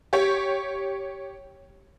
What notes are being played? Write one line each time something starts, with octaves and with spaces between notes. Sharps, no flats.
G4 C#5